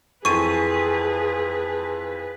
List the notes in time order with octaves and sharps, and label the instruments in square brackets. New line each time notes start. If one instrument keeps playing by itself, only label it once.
[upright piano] F2 E3 [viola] G#4 [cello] B4 [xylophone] C#6 D#7